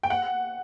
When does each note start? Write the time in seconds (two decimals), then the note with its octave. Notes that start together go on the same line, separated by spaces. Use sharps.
0.03 G5
0.10 F#5